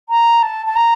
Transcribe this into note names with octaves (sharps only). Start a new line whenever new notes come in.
A#5
A5
A5
A#5